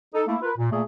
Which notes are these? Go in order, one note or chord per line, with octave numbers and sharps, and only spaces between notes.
D#4 A4
A3 A#3 E4
F4 A#4 B4
A#2
A#2 A3 A#3 G#4